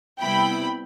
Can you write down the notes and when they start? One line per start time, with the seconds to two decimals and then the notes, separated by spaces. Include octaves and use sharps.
0.19 C3 G3 B3 E4 G5 B5